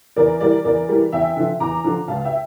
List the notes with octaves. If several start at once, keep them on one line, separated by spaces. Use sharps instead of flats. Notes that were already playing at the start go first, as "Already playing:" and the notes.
E2 A#4 D5
E3 G3 A#4 D5
E2 A#4 D5
E3 G3
E2 E5 G5
D3 F3
E2 A#5 D6
D3 F3
C#2 F5 A5
E5 G5